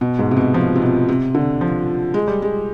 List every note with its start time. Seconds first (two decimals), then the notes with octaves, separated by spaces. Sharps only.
0.01 B2
0.19 G#2
0.31 C3
0.37 B2
0.54 F3
0.75 C3
0.82 B2
1.09 C3
1.35 D3
1.61 F3
2.14 G#3
2.28 G3
2.42 G#3